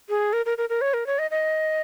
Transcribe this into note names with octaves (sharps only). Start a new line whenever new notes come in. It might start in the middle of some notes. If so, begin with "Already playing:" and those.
G#4
A#4
A#4
A#4
A#4
C#5
A#4
C#5
D#5
D#5